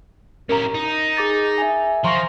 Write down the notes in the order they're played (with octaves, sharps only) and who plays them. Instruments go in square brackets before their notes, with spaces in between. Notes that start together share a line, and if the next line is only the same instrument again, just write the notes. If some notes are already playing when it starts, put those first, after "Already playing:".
[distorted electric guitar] C#4 G4 [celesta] A#4 A#5
[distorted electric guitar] D#4
[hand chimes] G#4 D6 A6
E5 G#5
[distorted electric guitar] F3 [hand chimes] A#5 [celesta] C6 C#6 A#6